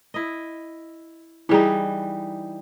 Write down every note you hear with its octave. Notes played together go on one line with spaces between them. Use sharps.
E4 D#5
E3 G3 D#4 E4 G#4